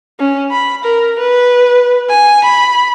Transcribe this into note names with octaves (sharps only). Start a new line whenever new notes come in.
C#4
B5
A#4
B4
G#5
B5